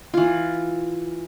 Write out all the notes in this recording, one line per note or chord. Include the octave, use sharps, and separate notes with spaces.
E3 F4